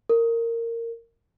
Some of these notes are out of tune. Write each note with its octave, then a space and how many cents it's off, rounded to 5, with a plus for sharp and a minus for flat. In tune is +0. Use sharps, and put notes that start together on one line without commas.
A#4 -15